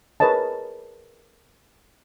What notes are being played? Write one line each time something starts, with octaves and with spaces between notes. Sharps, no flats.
G#4 A#4 B4 C#5 D#5 A5